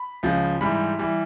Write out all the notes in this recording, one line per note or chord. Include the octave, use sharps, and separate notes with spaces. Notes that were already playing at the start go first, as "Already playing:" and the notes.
Already playing: B5
C#2 C#3 F3
G#2 E3 G3 B5
E3 G3